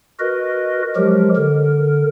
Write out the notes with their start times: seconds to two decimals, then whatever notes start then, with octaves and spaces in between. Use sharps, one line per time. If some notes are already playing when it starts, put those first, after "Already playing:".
0.19 F#4 A#4 B4 D#5
0.96 F3 F#3 G#3 G4 A#4
1.36 D3 A#4